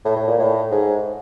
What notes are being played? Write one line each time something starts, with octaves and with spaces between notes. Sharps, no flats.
A2
A2
A#2
A2
G#2